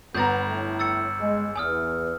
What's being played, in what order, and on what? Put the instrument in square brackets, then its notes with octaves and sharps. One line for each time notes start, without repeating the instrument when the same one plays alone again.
[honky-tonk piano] G1 A#5 [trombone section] B3 [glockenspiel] G6 A6
[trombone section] A2
[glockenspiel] E6 A6 C#7
[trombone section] G#3
[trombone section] E2 [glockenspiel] G#5 D#6 F6